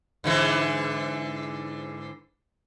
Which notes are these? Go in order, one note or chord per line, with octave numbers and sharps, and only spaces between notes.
G#2 D3 E3